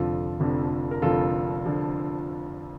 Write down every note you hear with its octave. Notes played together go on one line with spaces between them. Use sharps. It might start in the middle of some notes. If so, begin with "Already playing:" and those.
Already playing: F1 F2 D3 F3 F4 A4
F1 F2 D3 F3
A#4
F1 F2 D3 F3 F4 A4
D3 F3